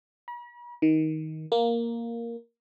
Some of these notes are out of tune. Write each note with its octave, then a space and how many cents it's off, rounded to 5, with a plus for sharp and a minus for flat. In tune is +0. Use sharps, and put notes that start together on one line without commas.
B5 -45
D#3 +15
A#3 +0